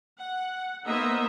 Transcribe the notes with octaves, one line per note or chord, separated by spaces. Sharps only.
F#5
A#3 B3 D#4 C5 D#5 E5